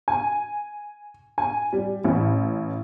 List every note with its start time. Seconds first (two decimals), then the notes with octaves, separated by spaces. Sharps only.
0.08 G#5
1.38 G#5
1.73 G3
2.04 A1